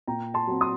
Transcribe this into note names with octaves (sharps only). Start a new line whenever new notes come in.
A#2 G5 A#5
A5 C6
F#3 C4
C6 D#6